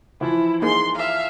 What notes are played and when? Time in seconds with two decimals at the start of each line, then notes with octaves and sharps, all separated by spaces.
0.21 E3 F3 E4
0.62 A#3 D#4 G#4 C6
0.96 E5 F5